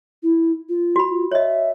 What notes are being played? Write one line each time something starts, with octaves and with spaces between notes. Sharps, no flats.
E4
F4
F#4 B5
F4
C#5 D#5 E5